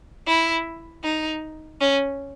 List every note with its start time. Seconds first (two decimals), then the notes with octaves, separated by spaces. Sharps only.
0.27 E4
1.03 D#4
1.81 C#4